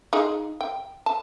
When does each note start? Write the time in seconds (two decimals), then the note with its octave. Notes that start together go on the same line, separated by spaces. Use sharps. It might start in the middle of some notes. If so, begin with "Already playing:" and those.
0.13 D#4 F4 G#4
0.61 G5
1.06 A5